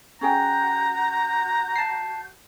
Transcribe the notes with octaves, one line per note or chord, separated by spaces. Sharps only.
C#4 F#4 G#4 G5 A#5 G6
A5 C7